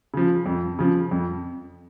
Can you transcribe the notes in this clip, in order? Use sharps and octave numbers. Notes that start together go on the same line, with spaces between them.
C#3 F3
F2
C#3 F3
F2